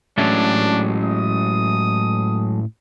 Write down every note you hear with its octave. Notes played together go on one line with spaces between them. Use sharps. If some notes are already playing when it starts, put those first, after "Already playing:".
A2 F#3 G#3 A3 C#4 D4
D#6